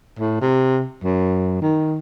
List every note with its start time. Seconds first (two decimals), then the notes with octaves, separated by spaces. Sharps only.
0.19 A2
0.41 C3
1.04 F#2
1.62 D#3